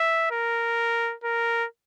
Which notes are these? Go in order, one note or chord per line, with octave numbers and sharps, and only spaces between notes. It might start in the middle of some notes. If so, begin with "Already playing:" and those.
Already playing: E5
A#4
A#4